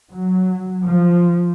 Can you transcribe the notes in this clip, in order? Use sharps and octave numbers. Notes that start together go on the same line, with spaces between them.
F#3
F3